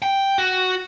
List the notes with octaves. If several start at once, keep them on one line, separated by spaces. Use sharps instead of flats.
G5
F#4